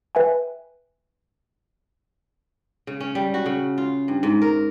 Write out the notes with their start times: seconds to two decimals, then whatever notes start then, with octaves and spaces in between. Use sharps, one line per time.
0.15 B4 E5 G5 G#5
2.87 C#3
3.00 C#4
3.15 G3
3.34 F#4
3.46 C#3
3.78 F4
4.08 G2
4.23 G#2
4.42 A#4